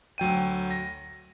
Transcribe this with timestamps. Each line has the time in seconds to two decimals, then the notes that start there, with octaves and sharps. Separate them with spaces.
0.18 D2 F#3 G5 D#7
0.71 A#6